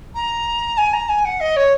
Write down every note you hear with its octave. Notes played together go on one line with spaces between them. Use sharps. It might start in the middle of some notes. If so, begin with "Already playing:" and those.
A#5
G#5
A#5
G#5
F#5
D#5
C#5